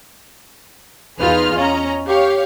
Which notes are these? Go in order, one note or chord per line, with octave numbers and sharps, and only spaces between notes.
E2 D#4 F4 G#4 B4 F6
C#4 D#5 A#5
G4 C#5 F5